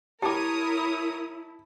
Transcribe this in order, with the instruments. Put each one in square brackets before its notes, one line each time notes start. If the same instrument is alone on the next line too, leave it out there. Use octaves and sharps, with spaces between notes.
[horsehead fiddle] E4 [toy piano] G4 D6 [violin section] A#4 C#5 D#6 [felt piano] A5